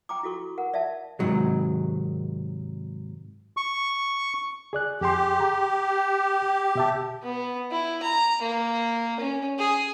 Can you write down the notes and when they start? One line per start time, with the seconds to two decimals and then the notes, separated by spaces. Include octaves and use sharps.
0.09 G5 A#5 D6
0.23 E4 F#4 A4 C#6
0.58 A#4 F#5
0.74 D5 E5 F5 A5
1.19 G#2 C3 D#3 F#3 G#3
3.57 C#6
4.73 G#4 D5 F#6
5.01 F2 G4 G#4 C6
5.40 G5 A#5
6.75 B2 E5 A5
7.23 B3
7.71 E4
8.02 A#5
8.42 A#3
9.20 C#4
9.58 G#4